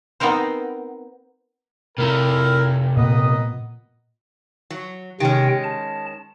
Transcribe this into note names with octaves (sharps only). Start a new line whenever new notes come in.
B3 C4 D#4 A#4 C5
C3 A3 E4 F4 A#4
A#2 B3 A#4 D#5
F#3
C3 D#3 G#3 C#4 G5
A5